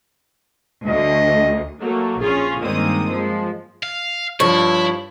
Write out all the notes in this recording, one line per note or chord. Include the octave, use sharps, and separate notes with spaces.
D2 D#5
F#3 A3 A#3
A#1 C#4 F4 G#4
G2 D#3 G#3 A#3 C4 D#6
F3 G#3
F5
G2 F3 E4 C#5